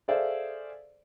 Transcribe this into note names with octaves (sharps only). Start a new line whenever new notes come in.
G#4 A4 C5 D5 E5 F5